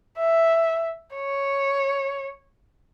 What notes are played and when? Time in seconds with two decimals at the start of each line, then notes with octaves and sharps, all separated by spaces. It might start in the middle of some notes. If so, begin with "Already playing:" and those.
0.18 E5
1.15 C#5